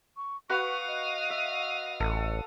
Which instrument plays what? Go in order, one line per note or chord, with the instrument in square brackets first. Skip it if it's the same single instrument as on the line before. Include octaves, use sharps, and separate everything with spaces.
[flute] C#6
[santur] F#4 B4 F#5 [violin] F5 D#6 [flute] C#6
[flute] D#5
[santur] E5
[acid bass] A1 [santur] A4